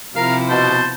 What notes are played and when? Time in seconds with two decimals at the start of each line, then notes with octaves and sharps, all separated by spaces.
0.15 C3 F3 E4 A#4 F5
0.49 B2 C5 A5